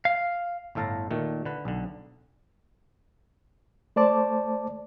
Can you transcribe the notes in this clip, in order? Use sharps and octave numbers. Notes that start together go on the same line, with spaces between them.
F5
G1 A2 A4 F5 A5 A#5
A#2 D#3 A3
D3 B4
B1 D3
A3 C5 D5 A5 D6